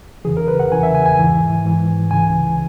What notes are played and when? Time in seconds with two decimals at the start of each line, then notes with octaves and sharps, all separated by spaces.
0.25 E2 C#3 E3 G#4
0.37 A#4
0.48 B4
0.60 F#5
0.71 E2 C#3 E3 G#5
0.83 E5
0.95 G#5
1.06 G#5
1.18 G#2 E3
1.65 G#2 E3
2.11 C#2 C#3 E3 G#5